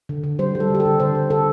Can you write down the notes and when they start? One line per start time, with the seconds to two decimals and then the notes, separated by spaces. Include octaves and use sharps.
0.09 D3
0.24 D3
0.39 G3 C5
0.55 G3
0.60 A4
0.70 D3 G4
0.80 A4
0.85 D3
1.00 D3 C5
1.15 D3
1.30 D3 A4